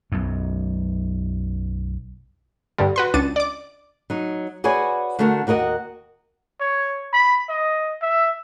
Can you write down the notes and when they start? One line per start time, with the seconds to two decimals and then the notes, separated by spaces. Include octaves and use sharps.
0.12 B1 F#2
2.78 G2 D3 G3
2.96 F#4 B4 C6
3.14 C#2 D4 A6 C#7 D#7
3.36 D5 D6
4.10 F#3 D#4
4.64 F#4 G#4 B4 C#5 D5 G#5
5.19 D3 A3 D4 F#4 A#4
5.47 D#2 F#4 A#4 D#5 F#5
6.60 C#5
7.13 B5
7.49 D#5
8.02 E5